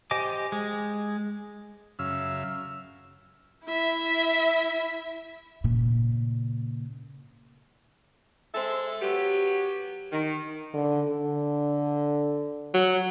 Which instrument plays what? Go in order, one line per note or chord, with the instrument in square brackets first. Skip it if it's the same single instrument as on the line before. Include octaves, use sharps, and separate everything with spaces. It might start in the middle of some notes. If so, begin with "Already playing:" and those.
[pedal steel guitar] G4 C5 D#5 G#5 D6
G#3
[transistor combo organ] F#2 C#3 E5 F5 E6
[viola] E4 E5
[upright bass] A#2 C#3
[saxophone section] G#3 A4 C5 E5
F#3 B3 G4
D#3
[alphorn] D3
D3
[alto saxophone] F#3